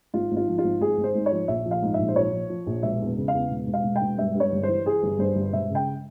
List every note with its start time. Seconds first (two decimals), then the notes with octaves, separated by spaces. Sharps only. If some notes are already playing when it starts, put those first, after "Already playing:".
0.14 G#1 F4
0.31 G#1
0.37 F4
0.48 F3
0.58 F4
0.64 G#1
0.81 G#1 G#4
0.97 G#1
1.04 C5
1.15 G#2
1.26 C#5
1.32 F3
1.48 A#1 E5
1.65 F3
1.71 F5
1.82 G#2
1.94 A#1 E5
2.08 C5
2.16 F3 C#5
2.32 F3
2.50 F3
2.66 A#1
2.83 E1 E5
3.01 E2
3.17 C#3
3.28 F5
3.33 E2
3.51 E1
3.67 E1
3.74 F5
3.84 E1
3.96 G5
4.02 E1
4.18 G2 E5
4.35 G2 C#5
4.52 G1
4.63 E3 C5
4.85 E3 G#4
5.03 G1
5.19 G2 C5
5.35 G1
5.53 E1 E5
5.70 C#3 G5